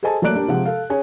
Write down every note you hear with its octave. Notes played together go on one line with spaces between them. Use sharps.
G#4 A4 C5 D#5 G#5 A5
F#3 A3 A#3 D5 F#6 D7
A#3 D4 G4
C3 F3 G#3 G4 F#5
A4 F5
C#4 G#4 C#5 G#5